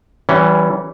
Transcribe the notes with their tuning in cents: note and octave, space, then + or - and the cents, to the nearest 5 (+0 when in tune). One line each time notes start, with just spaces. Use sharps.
E3 +0 G3 -30 C#4 +0